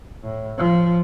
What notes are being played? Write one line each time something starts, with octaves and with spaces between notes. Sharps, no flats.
A2
F3